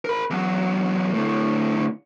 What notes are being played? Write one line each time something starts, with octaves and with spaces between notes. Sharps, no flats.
A#4 B5
E2 F#3
A2 D3